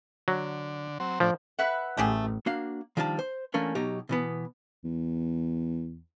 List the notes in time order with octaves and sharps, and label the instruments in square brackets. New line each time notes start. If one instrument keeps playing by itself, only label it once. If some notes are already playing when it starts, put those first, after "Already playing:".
[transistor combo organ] D3 [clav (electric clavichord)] F#3
[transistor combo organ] F#3 C4
[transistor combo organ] A2 D4 [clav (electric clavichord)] F3
[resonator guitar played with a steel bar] B4 E5 F#5
[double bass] A1 [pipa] A3 G4 G#4
[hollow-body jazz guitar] A#3 D4 F#4 F5
D#3 F3 G3 D4 G#5 A5
C5
E3 A3 A#3 C#4 D4
B2 F#3 D#4 G4
B2 E3 B3
[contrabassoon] E2